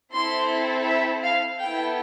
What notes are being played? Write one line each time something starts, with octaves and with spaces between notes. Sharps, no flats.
C4 E4 A4 C6
E5
F5
B3 E4 A4 G5